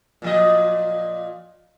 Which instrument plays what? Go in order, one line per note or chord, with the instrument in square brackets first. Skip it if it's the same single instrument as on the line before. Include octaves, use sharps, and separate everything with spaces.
[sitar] A#2 F3 D#5